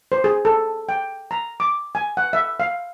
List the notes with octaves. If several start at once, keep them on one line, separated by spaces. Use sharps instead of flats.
C5
G#4
A4
G5
A#5
D6
G#5
F#5
E5
F5